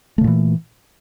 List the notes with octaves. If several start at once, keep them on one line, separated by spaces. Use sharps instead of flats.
A#2 C#3 E3 A3